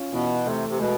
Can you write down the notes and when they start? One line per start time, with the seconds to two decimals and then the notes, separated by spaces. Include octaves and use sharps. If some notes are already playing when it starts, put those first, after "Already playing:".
Already playing: C#4 F4
0.13 B2 E3
0.45 C3 A3
0.69 C3
0.79 B2 G#3